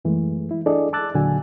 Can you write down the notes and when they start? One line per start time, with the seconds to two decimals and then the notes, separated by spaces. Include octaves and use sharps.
0.05 F#2 E3 G#3 A3
0.51 E4
0.66 D4 E4 G#4 A4 D5 D#5
0.93 A5 D6 E6 F#6 A6
1.14 D#2 A#2 D3 F#3 F#4 G#5